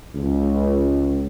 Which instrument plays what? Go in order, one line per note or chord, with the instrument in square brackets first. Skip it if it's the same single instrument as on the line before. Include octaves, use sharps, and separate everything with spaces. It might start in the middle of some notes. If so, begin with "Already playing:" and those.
[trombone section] C#2